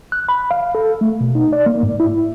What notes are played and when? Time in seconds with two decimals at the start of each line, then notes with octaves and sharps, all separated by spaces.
0.12 F#6
0.29 B5
0.51 F5
0.75 A4
1.01 A3
1.21 B2
1.35 D#4
1.53 D5
1.66 A#3
1.83 G#2
2.00 E4